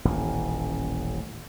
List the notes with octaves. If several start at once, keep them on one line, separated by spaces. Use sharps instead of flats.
D#1 A1